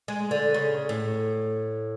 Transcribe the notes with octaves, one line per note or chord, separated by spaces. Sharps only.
G#3
D3
C#3
A2